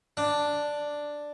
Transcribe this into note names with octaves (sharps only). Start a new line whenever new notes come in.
D4